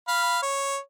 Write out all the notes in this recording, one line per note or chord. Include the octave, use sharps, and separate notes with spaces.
F5 B5
C#5